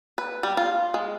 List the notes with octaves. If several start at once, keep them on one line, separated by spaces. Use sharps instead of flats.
B4
G3
F4
G#3